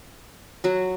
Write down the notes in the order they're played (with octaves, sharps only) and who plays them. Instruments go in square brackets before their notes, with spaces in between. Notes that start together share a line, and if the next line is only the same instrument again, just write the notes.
[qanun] F#3 F#4